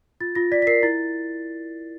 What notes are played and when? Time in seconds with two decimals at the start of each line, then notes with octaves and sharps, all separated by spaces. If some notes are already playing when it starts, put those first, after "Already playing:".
0.21 F4 A6
0.35 F4 A#6
0.52 D5 B6
0.62 B6
0.67 A#4 C7
0.83 E4 A6